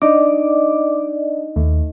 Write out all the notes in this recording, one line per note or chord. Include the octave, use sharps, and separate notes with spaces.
D4 D#4 D5 D#5 D6
D#2 A3